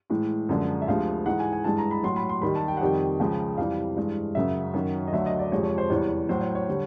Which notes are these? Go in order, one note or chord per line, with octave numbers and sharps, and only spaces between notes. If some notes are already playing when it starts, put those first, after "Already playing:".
A2 E3 G#3
F#2 D3 F3 G#3
E5
D2 C3 F3 G#3 F5
G#2 E3 G#3 F#5
G#5
G#5
G2 E3 G#3 A5
A#5
B5
A2 F#3 C6
B5
C6
D#2 D#3 G3 B5
A5
G5
F#5
F2 C3 D#3 G3 G5
C#2 C#3 F3 G#3
F2 C3 E3 G3 F5
G2 E3 G#3
F#2 C#3 F#3 E5
F#2 D#3 F#3
D#5
D2 D3 F#3 E5
D#5
D5
F2 C3 F3 G#3 C#5
C#5
C5
E2 C3 E3 G3 C#5
A2 F#3 C5
C#5
C#5
D3 G3